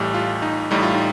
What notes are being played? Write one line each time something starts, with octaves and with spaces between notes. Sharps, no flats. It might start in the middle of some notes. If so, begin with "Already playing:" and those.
Already playing: A1 A2 G3 G4
F4
D#4
A1 A2 G3 D#4
F4
D#4